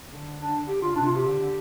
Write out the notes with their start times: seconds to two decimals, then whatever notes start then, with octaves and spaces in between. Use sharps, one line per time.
0.10 D3
0.39 D4
0.68 G4
0.82 F4
0.96 C3 D4
1.06 F4
1.16 G4
1.26 D3